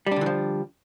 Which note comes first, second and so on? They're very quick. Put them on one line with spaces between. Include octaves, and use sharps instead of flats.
G3 D4 D3 E3 F3